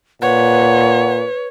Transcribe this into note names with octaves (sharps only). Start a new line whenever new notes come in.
A#2 B4 C#5 F#5